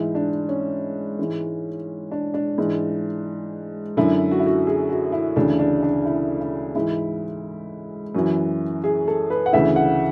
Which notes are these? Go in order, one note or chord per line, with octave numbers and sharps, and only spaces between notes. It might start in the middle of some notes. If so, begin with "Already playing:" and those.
Already playing: G#2 E3 E4
D4
C#4
G#2 E3
D4
D4
G#2 E3
F#2 D3 E4
F#4
E4
F#4
G#4
F#4
E4
D2 C#3 E3 D4
D4
D4
E4
E4
G#2 E3 E4
F#2 E3 F#4
G#4
A4
B4
F#5
D2 C#3 E3 E5
F#5